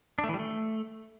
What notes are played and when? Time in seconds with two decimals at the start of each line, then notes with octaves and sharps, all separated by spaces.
0.19 D4
0.24 A3
0.29 E3
0.34 G3
0.39 A3